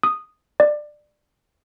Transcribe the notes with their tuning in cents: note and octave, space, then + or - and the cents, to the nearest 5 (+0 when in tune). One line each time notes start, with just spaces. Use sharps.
D#6 -5
D5 +20